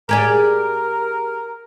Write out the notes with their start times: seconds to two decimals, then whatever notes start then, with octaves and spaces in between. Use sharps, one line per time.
0.09 G4 G#4 A#4 D5